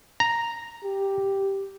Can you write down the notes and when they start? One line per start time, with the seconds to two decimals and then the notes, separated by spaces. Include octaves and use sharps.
0.20 A#5
0.84 G4